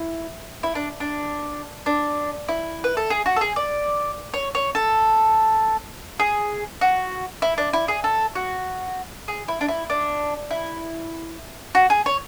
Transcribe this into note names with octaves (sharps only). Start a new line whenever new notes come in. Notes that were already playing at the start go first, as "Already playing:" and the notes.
Already playing: E4
E4
D4
D4
D4
E4
B4
A4
G#4
F#4
A4
G#4
D5
C#5
C#5
A4
G#4
F#4
E4
D4
E4
G#4
A4
F#4
G#4
E4
D4
E4
D4
E4
F#4
G#4
C#5